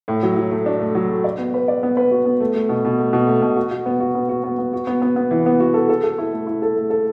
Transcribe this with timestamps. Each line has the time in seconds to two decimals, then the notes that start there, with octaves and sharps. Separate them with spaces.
0.08 A2
0.23 F#3
0.37 F#3
0.51 A3
0.66 D4
0.80 A3
0.95 F#3
1.09 A3
1.24 D5
1.38 B3
1.54 B4
1.68 D5
1.83 B3
1.97 B4
2.11 F#4
2.26 B3
2.40 A3
2.55 A3
2.69 B2
2.85 B2
2.99 A3
3.13 B2
3.27 A3
3.42 B2
3.56 F#4
3.71 F#4
3.86 B3
4.00 F#4
4.15 B3
4.29 F#4
4.44 B3
4.58 B3
4.73 F#4
4.87 B3
5.02 B3
5.16 B3
5.31 E3
5.46 B3
5.60 F#4
5.74 A4
5.89 A4
6.04 A4
6.18 E4
6.33 A3
6.47 E4
6.62 A4
6.76 A3
6.90 A4